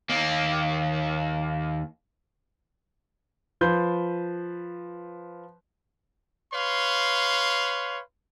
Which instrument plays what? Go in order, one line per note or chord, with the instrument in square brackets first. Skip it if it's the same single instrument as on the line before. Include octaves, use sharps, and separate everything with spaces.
[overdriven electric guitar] D#2 A#3
[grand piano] F3 B4 C6 G6
[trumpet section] B4 C#5 F5 C6